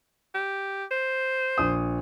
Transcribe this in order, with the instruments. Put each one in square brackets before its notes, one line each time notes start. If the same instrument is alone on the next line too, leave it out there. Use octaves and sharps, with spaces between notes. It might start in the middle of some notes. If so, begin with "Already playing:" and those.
[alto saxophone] G4
C5
[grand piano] A#1 D#6